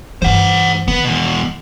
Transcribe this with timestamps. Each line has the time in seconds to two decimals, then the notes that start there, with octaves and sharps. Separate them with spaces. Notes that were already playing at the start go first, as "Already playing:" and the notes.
0.22 G2 E3 C5 F#5
0.88 D#3 B3
1.04 E2 B2